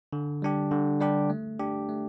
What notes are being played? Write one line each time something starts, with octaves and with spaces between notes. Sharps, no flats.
D3
G3 D4 G4
D3
G3 D4 G4
A3
D4 G4
A3